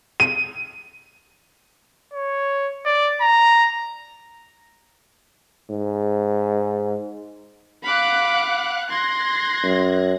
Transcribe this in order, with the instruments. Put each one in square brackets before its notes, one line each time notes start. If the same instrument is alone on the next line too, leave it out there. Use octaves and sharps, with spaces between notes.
[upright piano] D#7
[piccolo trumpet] C#5
D5
A#5
[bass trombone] G#2
[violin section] F5 F#5 F#6 [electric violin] B5 D6
[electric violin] C6 [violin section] F#6 G#6 A#6
[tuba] F#2